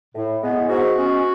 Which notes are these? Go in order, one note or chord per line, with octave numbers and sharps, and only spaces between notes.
A2
G#3 B3
G#2 F#4
G#3 C#4